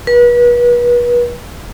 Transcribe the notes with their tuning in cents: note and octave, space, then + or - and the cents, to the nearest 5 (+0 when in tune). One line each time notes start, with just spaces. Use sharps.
B4 -35